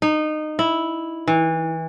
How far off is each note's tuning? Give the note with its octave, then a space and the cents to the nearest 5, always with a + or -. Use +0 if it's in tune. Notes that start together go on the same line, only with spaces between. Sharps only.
D#4 -20
E4 -5
E3 -25